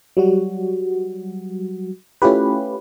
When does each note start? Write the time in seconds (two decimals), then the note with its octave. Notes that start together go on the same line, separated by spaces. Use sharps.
0.17 F#3 G3 F#4
2.22 A3 C#4 E4 F4 G4 B4